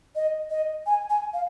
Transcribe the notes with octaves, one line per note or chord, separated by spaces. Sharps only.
D#5
D#5
G#5
G#5
F5